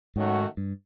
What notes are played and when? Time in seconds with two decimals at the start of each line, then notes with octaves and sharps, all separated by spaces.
0.16 G#2 D#3 F#3 A3 C#4 F#4
0.57 G2